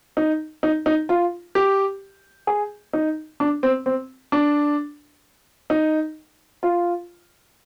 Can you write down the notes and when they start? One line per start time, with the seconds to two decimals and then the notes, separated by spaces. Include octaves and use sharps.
0.17 D#4
0.63 D#4
0.86 D#4
1.09 F4
1.55 G4
2.47 G#4
2.93 D#4
3.40 D4
3.63 C4
3.86 C4
4.32 D4
5.70 D#4
6.63 F4